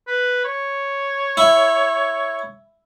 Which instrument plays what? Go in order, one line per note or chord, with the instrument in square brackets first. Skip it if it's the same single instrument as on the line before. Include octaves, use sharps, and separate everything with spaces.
[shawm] B4
C#5
[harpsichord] E4